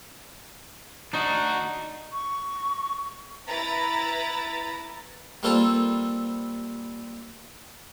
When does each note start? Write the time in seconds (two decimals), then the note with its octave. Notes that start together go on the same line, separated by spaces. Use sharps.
1.13 D4 D#4 F#4
2.12 C#6
3.47 E4 B4 A#5 B5 A6
5.43 G3 A#3 C4 F4 A4